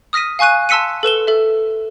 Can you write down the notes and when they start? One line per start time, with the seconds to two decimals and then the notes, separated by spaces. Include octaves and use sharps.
0.13 D#6 F6 A#6 B6 D#7
0.39 F5 G#5 C#6 F#6 D#7
0.69 A5 C6 E6 B6 C#7 D#7
1.03 A4 B4 E7 G7
1.27 A4 E5